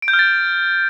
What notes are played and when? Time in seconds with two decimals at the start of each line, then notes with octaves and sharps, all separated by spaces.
0.02 D7
0.08 G6
0.13 F6
0.19 A6